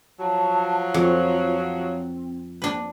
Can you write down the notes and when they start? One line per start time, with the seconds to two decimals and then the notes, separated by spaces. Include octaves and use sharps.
0.20 F3 F#3 A5
0.94 F2 F4
1.43 F4
1.57 C4
2.62 A#3 D4 B4